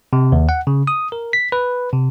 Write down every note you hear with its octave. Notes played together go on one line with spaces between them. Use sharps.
C3
D#2
F#5
C#3
D#6
A#4
B6
B4
C3